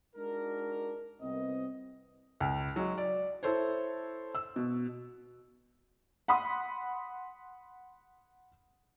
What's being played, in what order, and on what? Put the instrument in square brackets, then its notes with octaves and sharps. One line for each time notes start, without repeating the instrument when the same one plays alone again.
[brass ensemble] G#3 D4 D#4 F#4 A#4
C2 B3 C4 D#5
[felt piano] C#2
F#3 G#3
D5
E4 A4 C5 C#5
E6
B2
F#5 B5 C6 D#6